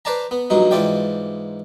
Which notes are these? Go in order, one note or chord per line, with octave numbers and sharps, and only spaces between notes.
B4 C5 D5 A5 A#5
B3
A#1 G2 F#3 D#4
G#2 E3 F4 D5 G5